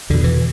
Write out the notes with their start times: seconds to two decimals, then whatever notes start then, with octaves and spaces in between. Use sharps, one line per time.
0.10 E2 B2 D3
0.24 E3